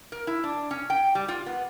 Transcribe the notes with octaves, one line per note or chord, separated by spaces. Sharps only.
A#4
E4
D4
C#4
G5
G3
F4
B3